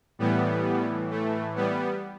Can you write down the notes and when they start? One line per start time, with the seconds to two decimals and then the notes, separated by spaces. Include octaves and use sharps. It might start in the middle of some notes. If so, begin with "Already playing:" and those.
0.19 A2 E3 G3 B3
1.11 A3
1.56 G3 B3